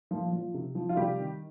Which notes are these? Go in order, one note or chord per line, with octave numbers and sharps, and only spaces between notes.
A#2 F3 F4
F3
C3
F3
F4
C3 G3 G4
D#3